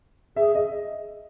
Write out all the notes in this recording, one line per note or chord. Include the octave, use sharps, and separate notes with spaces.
G#4 E5
D#5